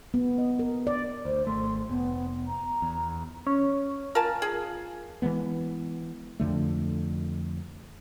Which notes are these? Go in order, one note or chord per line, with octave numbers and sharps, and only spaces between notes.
B3
D#5
A#4
D5
D2 C5
G#1 A3 C6
F1 B3
A#5
E2
C#4
F4 A#4 G#5 A5
G#4
E3 F#3 G#3 B3
F2 D3 A3